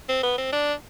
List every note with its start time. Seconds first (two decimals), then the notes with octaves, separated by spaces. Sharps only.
0.09 C4
0.23 B3
0.38 C4
0.52 D4